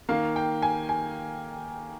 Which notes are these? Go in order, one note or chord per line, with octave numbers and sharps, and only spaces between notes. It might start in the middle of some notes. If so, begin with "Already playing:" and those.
D#3 A#3 F5
G5
G#5
G#5